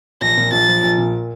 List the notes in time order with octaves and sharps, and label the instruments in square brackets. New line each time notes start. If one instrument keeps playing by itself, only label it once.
[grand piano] A#1 [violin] A#6
[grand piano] A#2
[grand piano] A#1 [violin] A6
[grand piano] F3
A#1
A#2